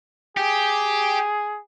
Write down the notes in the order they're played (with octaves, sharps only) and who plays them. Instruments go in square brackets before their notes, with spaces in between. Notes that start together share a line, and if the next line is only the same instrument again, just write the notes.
[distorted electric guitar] G4 [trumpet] G#4